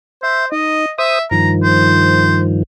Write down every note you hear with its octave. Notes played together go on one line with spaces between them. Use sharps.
C5 E5
D#4 D#5
C5 E5 D#6
G2 D#3 F3 A#5
C5